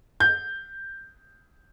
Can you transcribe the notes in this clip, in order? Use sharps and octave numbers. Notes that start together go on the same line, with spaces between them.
G6